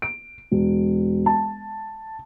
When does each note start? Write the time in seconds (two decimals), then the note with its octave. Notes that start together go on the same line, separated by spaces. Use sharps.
0.02 D7
0.51 E1
1.26 A5